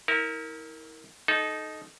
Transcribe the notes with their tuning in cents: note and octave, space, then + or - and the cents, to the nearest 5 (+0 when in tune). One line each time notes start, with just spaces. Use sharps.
E4 -35 A#4 +0
D#4 +0 A4 -25